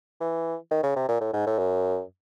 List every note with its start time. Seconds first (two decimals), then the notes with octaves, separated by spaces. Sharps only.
0.21 E3
0.71 D#3
0.83 C#3
0.96 C3
1.09 A#2
1.21 A2
1.33 G#2
1.47 A2
1.58 F#2